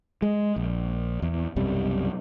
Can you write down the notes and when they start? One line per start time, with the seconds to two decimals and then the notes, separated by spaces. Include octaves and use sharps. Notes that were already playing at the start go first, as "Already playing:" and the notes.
0.22 G#3
0.56 A#1
1.22 E2
1.56 B1 F#2 C3 G3